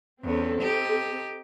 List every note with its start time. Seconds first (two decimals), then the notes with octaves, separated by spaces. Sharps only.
0.23 E2 C4 C#4 A4
0.61 D#4 G4